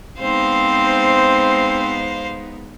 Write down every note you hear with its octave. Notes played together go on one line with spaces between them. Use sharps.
G#3 B3 C4 D#4 C5 F5